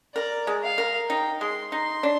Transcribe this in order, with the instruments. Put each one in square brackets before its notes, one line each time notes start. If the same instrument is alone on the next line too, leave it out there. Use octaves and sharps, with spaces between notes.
[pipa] A#4 [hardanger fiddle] D5
[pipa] G#3
[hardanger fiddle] F5
[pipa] A#4
[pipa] D#4 [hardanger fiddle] G5
[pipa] G#3 [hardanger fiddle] C6
[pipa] D#4 [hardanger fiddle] C6
[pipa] D4